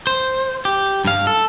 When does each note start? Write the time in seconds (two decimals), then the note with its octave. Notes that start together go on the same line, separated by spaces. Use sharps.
0.07 C5
0.65 G4
1.05 G2 F5
1.27 A4